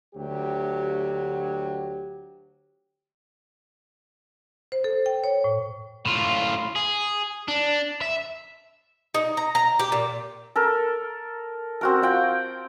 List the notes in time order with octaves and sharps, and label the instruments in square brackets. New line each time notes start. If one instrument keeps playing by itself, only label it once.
[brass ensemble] D2 F#3 G4
[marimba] C5
A4
G5
C#5
A2
[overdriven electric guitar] A2 F4
G#4
D4
E5
[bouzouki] D#4
A#5
A#5
G4
A#2
[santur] A4 A#4
C4 F#4 A#4
F4 F#5 G5